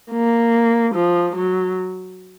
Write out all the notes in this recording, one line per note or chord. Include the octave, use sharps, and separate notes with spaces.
A#3
F3
F#3